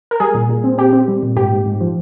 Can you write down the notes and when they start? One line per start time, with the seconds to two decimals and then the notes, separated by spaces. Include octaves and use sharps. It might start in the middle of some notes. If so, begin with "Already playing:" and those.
0.11 A#4
0.20 G3 G#4
0.34 A#2
0.49 A#2
0.64 C4
0.78 C4 G4
0.93 C4
1.08 G3
1.23 A#2
1.36 G#2 G4
1.51 G#2
1.66 G#2
1.81 F3